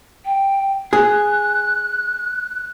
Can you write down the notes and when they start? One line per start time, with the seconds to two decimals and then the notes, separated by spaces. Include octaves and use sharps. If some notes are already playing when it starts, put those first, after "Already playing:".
0.25 G5
0.93 G#4 F#6